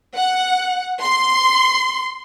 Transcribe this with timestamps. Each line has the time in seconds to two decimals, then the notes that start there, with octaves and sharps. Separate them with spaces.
0.16 F#5
1.02 C6